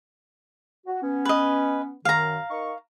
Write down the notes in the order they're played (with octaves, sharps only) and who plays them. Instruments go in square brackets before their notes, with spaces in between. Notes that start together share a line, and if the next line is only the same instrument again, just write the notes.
[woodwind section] F#4
B3 C#4
[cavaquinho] B4 D#5
[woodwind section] F#2 D#3 [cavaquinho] F5 A#5
[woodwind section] D#4 A#4 C#6